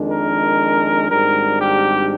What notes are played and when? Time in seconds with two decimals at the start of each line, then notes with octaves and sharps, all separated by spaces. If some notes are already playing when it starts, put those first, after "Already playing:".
Already playing: F2 D#3 G#3 D4
0.11 A#4
1.11 G#1 G#2 G3 D4 A#4
1.61 G4